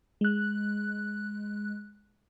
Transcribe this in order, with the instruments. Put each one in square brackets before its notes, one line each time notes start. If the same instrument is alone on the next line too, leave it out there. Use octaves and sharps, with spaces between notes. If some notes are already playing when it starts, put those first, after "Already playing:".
[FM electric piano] G#3 F#6